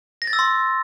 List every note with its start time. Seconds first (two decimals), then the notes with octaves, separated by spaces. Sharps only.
0.22 A#6
0.27 A6
0.33 E6
0.39 C6